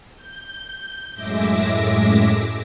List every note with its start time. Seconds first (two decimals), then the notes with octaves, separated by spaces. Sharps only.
0.15 G6
1.14 F#2 A2 G#3 E5 D6 A#6